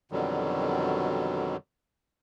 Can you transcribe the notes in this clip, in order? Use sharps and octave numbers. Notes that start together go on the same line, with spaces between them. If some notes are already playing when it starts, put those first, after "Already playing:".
F2 B2 D3 D#3 F#3 G3